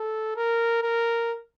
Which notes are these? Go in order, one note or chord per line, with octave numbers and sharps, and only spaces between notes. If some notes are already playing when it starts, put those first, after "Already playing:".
Already playing: A4
A#4
A#4